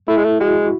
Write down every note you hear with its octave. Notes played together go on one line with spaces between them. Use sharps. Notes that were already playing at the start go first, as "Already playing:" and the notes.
A3 E4
G#3
A3
G#3 F#4